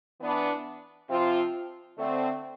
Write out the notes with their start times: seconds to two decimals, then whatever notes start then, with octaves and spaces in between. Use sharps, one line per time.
0.21 E3 B3 D4
1.10 C3 F3 C4 F4
1.98 D3 A3 C4